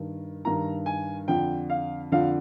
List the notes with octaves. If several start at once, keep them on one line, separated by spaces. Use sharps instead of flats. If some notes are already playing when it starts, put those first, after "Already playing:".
Already playing: G2 D#3
G2 D#3 A#5
G#5
F2 D3 G5
F5
F2 D3 F5